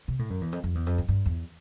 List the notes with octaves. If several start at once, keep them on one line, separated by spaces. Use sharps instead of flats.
C3
A2
F#2
E2
F2
F2
E2
F2
G2
G2
E2